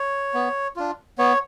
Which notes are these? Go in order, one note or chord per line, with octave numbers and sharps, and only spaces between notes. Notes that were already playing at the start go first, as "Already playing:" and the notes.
Already playing: C#5
B3
D4 F4
B3 C#5